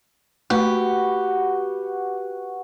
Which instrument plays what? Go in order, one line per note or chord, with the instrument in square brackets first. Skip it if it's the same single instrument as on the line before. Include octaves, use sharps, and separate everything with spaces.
[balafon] A3 [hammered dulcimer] F#4 B4 [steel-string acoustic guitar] G4